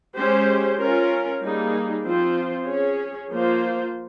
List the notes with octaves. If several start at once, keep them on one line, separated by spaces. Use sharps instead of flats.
G#3 C#4 G4 C5
C#4 F4 A#4
G3 A#3 D#4 G#4
F3 C4 F4 C5
C#4 G#4 C#5
F3 A#3 F4 C5